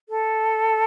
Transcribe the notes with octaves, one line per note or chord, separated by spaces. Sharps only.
A4